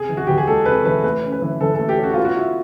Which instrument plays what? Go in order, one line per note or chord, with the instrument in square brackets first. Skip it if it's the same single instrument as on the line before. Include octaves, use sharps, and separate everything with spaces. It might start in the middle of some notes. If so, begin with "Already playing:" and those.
Already playing: [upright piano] C3 [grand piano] G#4
[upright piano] E3
[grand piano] F#4
[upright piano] E2 [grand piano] G4
[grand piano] G#4
[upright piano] G#3 [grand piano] A4
[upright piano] C3 [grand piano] B4
[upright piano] E3 [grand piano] B4
[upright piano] A3 [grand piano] B4
[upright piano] C#4
[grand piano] B4
[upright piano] E3
[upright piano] E3 [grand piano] A4
[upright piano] A3 [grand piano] A4
[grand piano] G4
[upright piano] C#4 [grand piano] F#4
[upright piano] B3 [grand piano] F4
[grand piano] F#4
[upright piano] E4